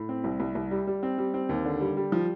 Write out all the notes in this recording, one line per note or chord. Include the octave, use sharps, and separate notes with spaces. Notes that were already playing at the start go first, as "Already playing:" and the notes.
Already playing: A2
C4
C2
C2
C2
G3
G3
C4
G3
C4
D#2
D3
G3
G3
F3